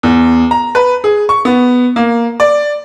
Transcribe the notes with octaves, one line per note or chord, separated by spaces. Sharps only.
E2
A#5
B4
G#4
C#6
B3
A#3
D5